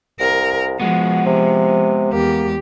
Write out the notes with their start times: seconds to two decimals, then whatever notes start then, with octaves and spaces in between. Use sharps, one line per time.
0.20 C2 A#4
0.80 F3 G#3 B3 F#4
1.26 C3
2.13 E2 A#3 G4